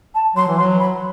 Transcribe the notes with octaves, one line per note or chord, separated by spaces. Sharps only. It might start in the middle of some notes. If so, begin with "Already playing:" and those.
A5
F#3 C6
E3
C6
F#3
B5